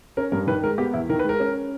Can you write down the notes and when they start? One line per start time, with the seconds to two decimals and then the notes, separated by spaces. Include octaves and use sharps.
0.17 C#4 A#4
0.32 G2 A#4
0.47 D#3 B4
0.63 G#3 A#4
0.78 B3 G4
0.93 E2 E4
1.09 D#3 A#4
1.19 B4
1.24 G#3 A#4
1.40 C#4